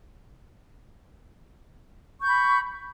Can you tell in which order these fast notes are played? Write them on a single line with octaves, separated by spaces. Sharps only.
C#6 G6 B5